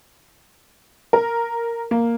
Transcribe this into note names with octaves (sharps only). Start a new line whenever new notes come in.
A#4
A#3